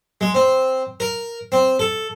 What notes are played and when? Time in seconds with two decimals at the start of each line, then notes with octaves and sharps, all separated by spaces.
0.21 G#3
0.34 C4
1.00 A#4
1.52 C4
1.79 A4